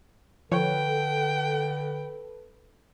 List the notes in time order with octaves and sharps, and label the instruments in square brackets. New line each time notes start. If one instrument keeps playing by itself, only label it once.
[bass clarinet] D3 [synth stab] F3 C#5 [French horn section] A4 B4 [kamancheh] G5